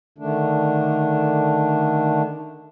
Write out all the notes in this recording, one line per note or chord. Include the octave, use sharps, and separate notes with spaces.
D3 D#3 A3 D4